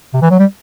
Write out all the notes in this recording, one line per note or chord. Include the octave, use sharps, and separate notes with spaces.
C3
E3
F#3
G3